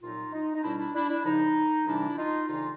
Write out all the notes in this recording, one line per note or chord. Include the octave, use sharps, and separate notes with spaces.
C2 A#2 F#3 D#4 F4
D#4
D#4
C#2 B2 G3 D4 E4
D4 E4
D4 E4
D4 E4
D#2 C#3 F3 D#4
D2 C3 E3 G3 D4 E4
E4
D#4 F4
D2 C#3 E3 G3 D#4 F4